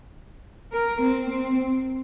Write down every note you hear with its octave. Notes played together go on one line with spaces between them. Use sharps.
A#4
C4
C4